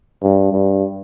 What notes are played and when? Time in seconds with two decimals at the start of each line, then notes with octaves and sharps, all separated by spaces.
0.23 G2
0.52 G2